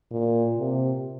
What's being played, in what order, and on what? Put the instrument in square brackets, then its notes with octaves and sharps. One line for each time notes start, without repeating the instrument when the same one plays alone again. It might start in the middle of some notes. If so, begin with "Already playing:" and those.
[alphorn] A#2
C3